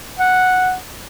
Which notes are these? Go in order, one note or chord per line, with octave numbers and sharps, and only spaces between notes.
F#5